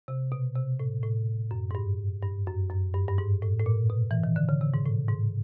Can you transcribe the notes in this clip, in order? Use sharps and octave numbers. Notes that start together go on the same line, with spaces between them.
C3
B2
C3
A2
A2
F#2
G#2
G2
G2
F#2
F#2
G2
G2
G#2
A2
A2
A#2
B2
E3
D#3
D3
C#3
C3
G#2
A2
G#2